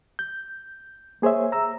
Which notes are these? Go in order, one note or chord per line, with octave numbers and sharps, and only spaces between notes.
G6
A#3 G#4 C5 C#5 E5
A#5 E6